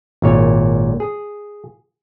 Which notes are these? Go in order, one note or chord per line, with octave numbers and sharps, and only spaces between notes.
G#1 A#2 C#5
G#4